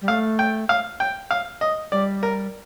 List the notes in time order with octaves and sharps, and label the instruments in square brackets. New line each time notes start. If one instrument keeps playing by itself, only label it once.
[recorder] G3
[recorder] A3 [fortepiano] F5
[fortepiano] G5
F5
G5
F5
D#5
[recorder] G3 [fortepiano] D5
[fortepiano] A#4